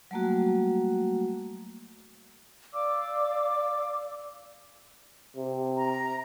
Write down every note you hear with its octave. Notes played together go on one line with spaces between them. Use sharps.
F#3 G3 A3 A#3 F#4
D5 F5 D6 E6
C3
A#5